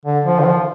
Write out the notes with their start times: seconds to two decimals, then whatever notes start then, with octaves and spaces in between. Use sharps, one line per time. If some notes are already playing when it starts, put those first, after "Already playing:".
0.06 D3
0.25 F3
0.40 D3
0.46 F3